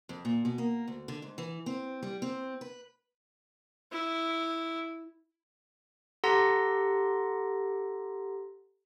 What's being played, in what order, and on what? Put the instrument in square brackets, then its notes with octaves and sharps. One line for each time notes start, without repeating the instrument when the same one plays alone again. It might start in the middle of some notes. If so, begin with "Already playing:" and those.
[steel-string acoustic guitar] F2
A#2
B2
A#3
D2
D3
G#2
E3
C4
G3
C4
B4
[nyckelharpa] E4
[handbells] G4 A4 F#5 A#5 C6 A#6